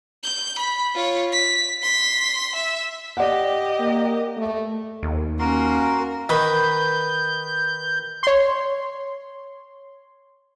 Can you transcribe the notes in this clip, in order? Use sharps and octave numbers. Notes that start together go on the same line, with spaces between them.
G6
B5
F4 C#5
B6
C6 B6
E5
G4 D5 D#5 F#5
A#3
A3
D#2
A#3 C#4 F#4 A#4 C6
D#3 B4 B5 G6
C#5 C6